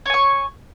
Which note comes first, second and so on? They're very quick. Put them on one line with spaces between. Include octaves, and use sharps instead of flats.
C#5 G#5 C#6